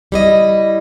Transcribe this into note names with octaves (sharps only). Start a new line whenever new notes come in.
G3 E4 D#5